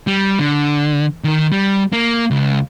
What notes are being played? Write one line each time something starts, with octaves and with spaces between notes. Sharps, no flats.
G3
D3
D#3 A#4
G3
A#3
C#2